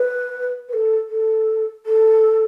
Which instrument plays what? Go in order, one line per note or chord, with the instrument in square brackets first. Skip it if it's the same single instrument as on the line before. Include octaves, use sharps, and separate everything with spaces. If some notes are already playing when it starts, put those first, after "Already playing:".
Already playing: [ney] B4
B4
A4
A4
A4